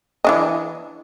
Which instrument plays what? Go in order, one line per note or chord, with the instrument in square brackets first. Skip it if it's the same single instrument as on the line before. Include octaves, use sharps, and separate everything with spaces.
[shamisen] E3 D4 D#5